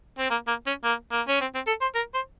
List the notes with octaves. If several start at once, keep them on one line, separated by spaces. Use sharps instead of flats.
C4
A#3
A#3
C#4
A#3
A#3
C#4
C4
C4
A4
C5
A#4
C5